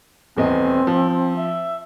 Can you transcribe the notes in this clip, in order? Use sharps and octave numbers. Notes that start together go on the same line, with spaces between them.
D#1 E2 C4 D#5
F3
E5